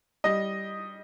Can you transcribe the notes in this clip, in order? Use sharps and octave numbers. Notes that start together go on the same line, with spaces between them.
G3 D#5